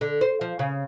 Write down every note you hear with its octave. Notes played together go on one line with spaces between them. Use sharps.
D3
C5
F3
C#3